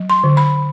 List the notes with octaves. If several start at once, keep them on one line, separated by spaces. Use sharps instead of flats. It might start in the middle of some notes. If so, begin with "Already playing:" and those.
Already playing: F#3
C6
D3
B5